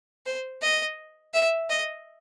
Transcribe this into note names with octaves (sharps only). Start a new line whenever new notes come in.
C5
D#5
E5
D#5